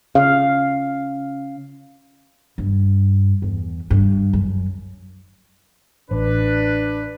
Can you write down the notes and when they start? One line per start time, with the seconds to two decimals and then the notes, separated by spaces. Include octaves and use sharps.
0.15 C#3 F5
2.58 G2
3.42 E2
3.90 G2
4.33 F#2
6.11 A1 D4 B4